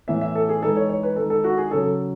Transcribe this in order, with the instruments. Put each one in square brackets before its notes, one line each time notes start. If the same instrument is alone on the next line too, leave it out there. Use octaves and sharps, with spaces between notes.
[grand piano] A2 E3 B3 E4 E5
E5
A4
G#4
E3 G#3 D#4 A4
C#5
C#5
B4
D#3 G#3 D#4 A4
A4
F#4
G#4
C#3 F#3 C#4 A4